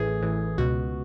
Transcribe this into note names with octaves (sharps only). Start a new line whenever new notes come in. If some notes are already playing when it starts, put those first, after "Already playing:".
Already playing: A1 A2 E3 G#4
A1 A2 E3
C#2 B2 F#4